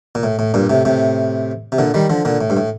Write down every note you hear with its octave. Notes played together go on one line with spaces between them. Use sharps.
A#2
A2
A2
G2 A#2
A2 C3
A2 C3
C3
A#2 D3
D#3 G3
D3 F3
A#2 D3
A2
G2
A2